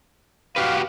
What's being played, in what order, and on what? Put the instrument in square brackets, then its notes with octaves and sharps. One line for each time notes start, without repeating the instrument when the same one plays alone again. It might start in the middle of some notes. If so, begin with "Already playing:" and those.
[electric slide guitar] F#4 G4 B4 [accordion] F5